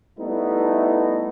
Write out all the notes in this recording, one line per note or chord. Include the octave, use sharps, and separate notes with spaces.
G3 A3 B3 D#4 E4